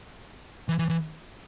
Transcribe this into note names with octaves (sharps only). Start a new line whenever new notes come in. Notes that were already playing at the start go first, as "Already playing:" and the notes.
E3
E3
E3